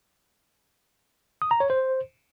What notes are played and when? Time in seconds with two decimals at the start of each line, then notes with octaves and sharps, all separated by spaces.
1.42 D#6
1.51 A#5
1.60 C#5
1.70 C5